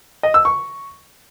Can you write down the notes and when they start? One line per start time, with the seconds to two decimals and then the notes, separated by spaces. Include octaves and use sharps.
0.23 D#5
0.34 E6
0.45 C#6